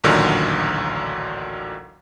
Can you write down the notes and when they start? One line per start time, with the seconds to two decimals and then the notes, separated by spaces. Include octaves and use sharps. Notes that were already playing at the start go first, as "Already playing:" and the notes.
0.04 A1 D2 A#2 D3 D#3 F#3